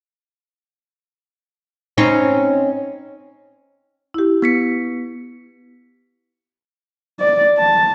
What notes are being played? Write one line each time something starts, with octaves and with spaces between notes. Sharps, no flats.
C4 C#4 D#4
E4 G4
B3 B6 C#7
D5
A5